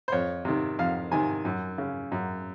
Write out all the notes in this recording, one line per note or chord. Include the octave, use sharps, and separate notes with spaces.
C5
F2 C#5
C3 D#3
F2 F5
C3 D#3 G#5
F#2
C#3
F#2